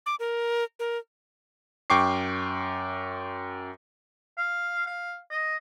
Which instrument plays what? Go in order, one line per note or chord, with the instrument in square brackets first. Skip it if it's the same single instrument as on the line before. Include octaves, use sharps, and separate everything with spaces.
[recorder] D6
A#4
A#4
[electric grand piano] F#2 G5 C#6 D6 C7
[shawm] F5
F5
D#5